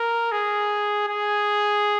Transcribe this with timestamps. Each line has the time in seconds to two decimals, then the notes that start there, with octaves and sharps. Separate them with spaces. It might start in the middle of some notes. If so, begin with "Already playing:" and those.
Already playing: A#4
0.32 G#4
1.08 G#4